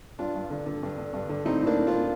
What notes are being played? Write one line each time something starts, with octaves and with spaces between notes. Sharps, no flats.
G2 D4 F4
G2
D3
D3
G2
D3
G2
D3
A2 C4 D#4
A2
A#3 D4
A2
D4 F4
A2